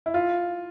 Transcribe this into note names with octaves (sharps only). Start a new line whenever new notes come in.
E4
F4